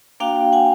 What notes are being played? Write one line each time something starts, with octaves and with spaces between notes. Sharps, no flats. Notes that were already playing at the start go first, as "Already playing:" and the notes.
A#3 D4 F#4 F5 G5
F#5 G#5